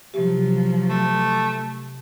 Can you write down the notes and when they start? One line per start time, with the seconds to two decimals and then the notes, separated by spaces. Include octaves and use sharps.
0.14 C3 F3 F#3 G4
0.89 A3